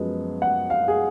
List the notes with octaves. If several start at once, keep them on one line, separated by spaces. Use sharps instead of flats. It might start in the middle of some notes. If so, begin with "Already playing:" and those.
Already playing: F#2 F3 G#3 B3
F#5
F5
G#4